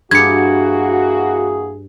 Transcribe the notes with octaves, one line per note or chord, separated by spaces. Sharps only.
G2 E3 A#3 F#4 G#4 G#6 C#7